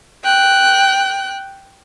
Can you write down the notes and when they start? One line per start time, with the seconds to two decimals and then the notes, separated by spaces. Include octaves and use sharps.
0.24 G5 F#6